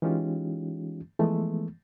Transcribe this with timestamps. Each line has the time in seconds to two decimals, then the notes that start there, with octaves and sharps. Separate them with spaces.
0.02 E3 G#3 C#4 D#4 F4 G4
1.20 E3 F3 G#3 A3 B3